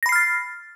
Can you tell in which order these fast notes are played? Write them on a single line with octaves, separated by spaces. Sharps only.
A#6 B5 C7 F6 A6